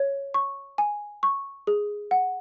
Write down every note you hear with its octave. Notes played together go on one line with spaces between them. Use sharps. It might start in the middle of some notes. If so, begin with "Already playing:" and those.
Already playing: C#5
C#6
G#5
C#6
G#4
F#5